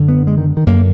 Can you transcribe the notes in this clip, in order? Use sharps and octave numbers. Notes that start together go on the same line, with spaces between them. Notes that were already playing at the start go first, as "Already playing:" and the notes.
Already playing: F#2 D3
B3
G#3
D#3
D#3
F#2 D3 A#3